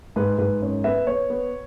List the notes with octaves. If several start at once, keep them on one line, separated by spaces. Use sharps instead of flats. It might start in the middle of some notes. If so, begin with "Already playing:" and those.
G#2 B4
G#2 B4
F#2 C#5
B3 B4 E5
B3 C#5
B3